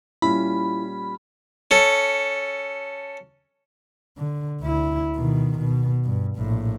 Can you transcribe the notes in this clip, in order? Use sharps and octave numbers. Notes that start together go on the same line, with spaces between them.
A#2 G3 C#4 E4 B5
C#4 A4
D3
D2 E4
B2 D#3
B2
G2
A#1 A2